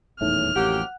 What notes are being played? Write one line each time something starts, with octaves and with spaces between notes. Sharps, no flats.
D#1 E2 A2 D#4 C#5 E5 F6
A1 F2 F#3 A#3 G4 F#5 F#6